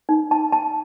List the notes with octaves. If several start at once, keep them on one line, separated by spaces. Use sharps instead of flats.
D#4
A5
A5